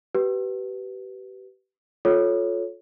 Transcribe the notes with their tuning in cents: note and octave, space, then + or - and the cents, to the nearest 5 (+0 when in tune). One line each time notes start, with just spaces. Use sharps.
G4 -30 B4 +0
F4 +25 A4 -20 C#5 +0